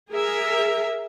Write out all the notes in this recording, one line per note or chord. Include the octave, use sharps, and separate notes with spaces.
G#4 A#4 E5